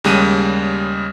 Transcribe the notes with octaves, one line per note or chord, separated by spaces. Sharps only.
D#2 C#3 G3 G#3 F#6 D#7